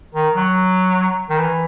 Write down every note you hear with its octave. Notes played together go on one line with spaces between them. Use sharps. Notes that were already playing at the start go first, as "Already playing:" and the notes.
D#3
F#3
D#3
E3